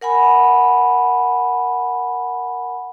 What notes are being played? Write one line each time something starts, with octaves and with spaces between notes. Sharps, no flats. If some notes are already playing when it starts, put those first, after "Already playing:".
A#4 F#5 G#5 B5